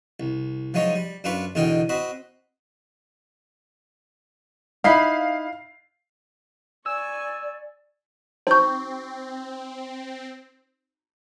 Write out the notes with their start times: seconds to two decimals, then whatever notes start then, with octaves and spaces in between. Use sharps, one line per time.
0.20 C2
0.74 F3 F#3 G#3 D#4 C#5 A#5
0.95 G3
1.24 F#2 D4 F4 B4 C#6
1.55 E2 B2 D3 D#4 A#4 G5
1.89 C4 F#4 D#5 B5
4.84 D#4 E4 F5 B5 C7
6.86 D5 G#5 C#6 E6
8.47 C4 D#4 F#4 C5 C#6 G6